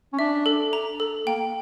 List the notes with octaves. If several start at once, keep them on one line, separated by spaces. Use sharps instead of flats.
C#4
D4 E5
A4
A#5
A4
A#3 G5